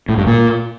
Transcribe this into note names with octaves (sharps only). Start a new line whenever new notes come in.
A2
G2
A#2